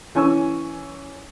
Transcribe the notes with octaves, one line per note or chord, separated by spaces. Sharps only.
E3 C#4 G#5 C#6 E6